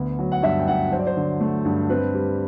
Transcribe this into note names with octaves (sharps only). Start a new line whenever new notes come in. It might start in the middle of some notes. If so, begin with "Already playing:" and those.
Already playing: D2 B3
F#3
F#5
G2 E5
G5
G2 F#5
F#3 C5
D5
C5
D3
A3
G2
C4 B4
G3